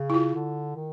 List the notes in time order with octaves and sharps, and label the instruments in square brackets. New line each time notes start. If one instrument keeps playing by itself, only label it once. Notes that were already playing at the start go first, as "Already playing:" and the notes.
Already playing: [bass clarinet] C#3
[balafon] E4
F4
[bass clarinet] D3
D#3